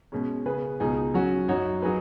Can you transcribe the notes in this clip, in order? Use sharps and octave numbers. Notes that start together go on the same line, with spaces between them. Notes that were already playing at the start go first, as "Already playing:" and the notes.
B2 G#3 C#4
C#3 B3 G#4 B4
C#2 B2 G#3 D#4 G#4
F#3 C#4 F#4
F#2 F#3 D#4 F#4 C#5
F#3 D#4 G#4 B4